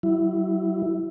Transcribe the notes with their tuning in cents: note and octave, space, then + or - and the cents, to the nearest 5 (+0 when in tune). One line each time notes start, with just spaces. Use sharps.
F#3 +40 E4 +0